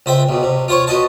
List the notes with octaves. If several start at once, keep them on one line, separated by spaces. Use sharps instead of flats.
C#2 C5 E5 G5
B1 B2
C3
F4 C5 C#5 C#6
B3 F#4 D#5 A5